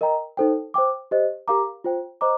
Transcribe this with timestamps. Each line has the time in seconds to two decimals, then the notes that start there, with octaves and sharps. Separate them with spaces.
0.01 A#4 D#5 G5 A#5
0.37 D#4 A4 C5 G5
0.74 C5 G5 D6
1.11 G4 C5 D#5
1.48 G4 A#4 F5 A#5 D6
1.84 F4 C5 G5
2.21 C5 D#5 A#5 D6